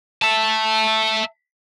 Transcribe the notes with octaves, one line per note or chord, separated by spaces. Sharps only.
E5 A5